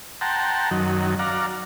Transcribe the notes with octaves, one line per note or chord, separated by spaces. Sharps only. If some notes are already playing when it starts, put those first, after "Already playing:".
F#5 G5 A5 A#5 C6
F#2 D#3 F#3
D5 F5 F#5 A#5